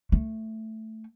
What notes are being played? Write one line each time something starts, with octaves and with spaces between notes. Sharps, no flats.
A3